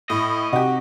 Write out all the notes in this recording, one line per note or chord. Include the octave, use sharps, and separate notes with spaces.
A2 D#5
C3 D#4 F#4 G4